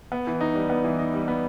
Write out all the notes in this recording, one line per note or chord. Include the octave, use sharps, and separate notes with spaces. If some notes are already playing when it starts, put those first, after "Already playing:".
B3
E3
D#4
G3
B3
E3
D#4
G3
B3